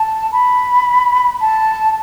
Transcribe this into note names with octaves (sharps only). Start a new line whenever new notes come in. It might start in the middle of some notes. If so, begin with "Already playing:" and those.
Already playing: A5
B5
A5